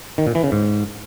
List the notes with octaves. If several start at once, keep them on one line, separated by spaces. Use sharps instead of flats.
D#3
A#2
E3
C#3
G#2